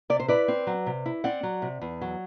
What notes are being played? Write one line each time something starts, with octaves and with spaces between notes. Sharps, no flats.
C3 D5
C5
E4 B4 D5
C4
F#3
C3
E4
C4 D5 F#5
F#3
C3
E2
F#3